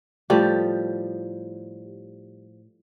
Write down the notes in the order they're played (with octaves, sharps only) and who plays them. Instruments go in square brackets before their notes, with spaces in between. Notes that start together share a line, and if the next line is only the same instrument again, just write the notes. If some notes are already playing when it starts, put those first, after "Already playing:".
[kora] A2 F3 G3 G4